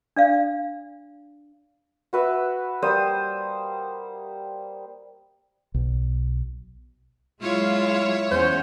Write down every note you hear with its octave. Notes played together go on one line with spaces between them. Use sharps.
D4 D5 F5
F#4 B4 E5
G3 A#3 C5 D#6
B1
F#3 G#3 E4 F4 C#5 F5
E2 C#4 C5 F#5